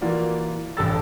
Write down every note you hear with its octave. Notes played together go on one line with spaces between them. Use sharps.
E3 A#3 F4 F#4 D5
A1 G2 A4 G5 E6 A6